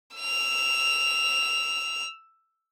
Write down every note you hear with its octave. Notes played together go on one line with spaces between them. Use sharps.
E6 F7